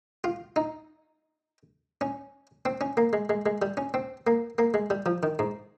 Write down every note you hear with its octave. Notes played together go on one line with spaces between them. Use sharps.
F4
D#4
C#4
C4
C#4
A#3
G#3
G#3
G#3
G3
C#4
C4
A#3
A#3
G#3
G3
F3
D#3
G#2